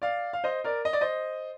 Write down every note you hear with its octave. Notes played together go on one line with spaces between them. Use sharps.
D5 F5
F5
C5 D#5
A#4 D5
D#5
D5
C5 D#5